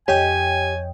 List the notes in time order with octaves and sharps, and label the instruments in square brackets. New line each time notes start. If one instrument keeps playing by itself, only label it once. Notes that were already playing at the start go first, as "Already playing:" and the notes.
[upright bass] F2 [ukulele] G4 [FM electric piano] C#5 D#5 G5 [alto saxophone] G#5